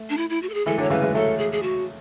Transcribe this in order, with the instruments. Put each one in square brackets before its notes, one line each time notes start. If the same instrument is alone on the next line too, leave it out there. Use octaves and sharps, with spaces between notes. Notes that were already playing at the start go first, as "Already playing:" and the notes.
Already playing: [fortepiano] A3
[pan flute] D4
E4
E4
F#4
A4
G#4
[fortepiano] E3 G#3 [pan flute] A4
[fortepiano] D3 F#3
[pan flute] C#5
[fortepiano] C#3 E3 [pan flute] B4
[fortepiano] E3 G#3
[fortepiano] F#3 A3 [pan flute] A4
[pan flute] G#4
G#4
F#4